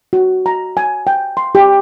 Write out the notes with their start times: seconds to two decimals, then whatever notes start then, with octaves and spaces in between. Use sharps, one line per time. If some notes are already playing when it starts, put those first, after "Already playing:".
0.13 F#4
0.46 A#5
0.77 G#5
1.07 G5
1.37 C6
1.55 G4